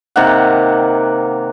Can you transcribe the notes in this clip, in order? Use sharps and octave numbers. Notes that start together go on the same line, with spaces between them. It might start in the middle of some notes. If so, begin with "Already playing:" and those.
C3 D#3 A#3 F#5